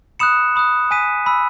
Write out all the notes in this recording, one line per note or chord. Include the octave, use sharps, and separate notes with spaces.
B5 D#6 F#6 C#7 E7
B5 D#6 F#6
G#5 D#6 F#6 B6 D#7
B5 E6